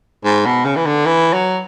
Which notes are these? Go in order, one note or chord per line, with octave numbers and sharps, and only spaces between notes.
G#2
B2
C#3
E3
D3
E3
F#3